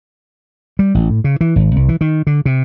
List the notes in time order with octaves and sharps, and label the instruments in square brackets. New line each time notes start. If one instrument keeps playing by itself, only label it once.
[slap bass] G3
A1
A2
C#3
E3
G#1
C2
E3
D#3
D3
C3